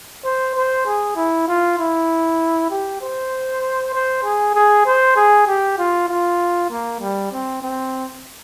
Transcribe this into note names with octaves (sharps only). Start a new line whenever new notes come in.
C5
C5
G#4
E4
F4
E4
G4
C5
C5
G#4
G#4
C5
G#4
G4
F4
F4
A#3
G3
C4
C4